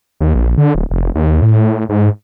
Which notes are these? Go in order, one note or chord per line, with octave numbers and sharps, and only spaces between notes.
D#2
A#1
D3
D1
F1
D#2
A2
G#2